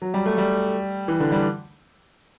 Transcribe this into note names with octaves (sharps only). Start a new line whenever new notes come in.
F#3
G3
A3
G3
E3
D3
G3